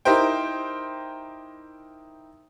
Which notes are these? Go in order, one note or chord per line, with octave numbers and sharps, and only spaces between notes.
D#4 E4 G4 A#4 C5 G5